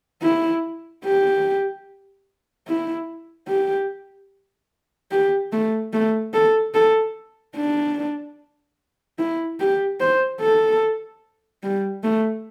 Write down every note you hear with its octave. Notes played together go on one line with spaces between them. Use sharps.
E4
G4
E4
G4
G4
A3
A3
A4
A4
D4
E4
G4
C5
A4
G3
A3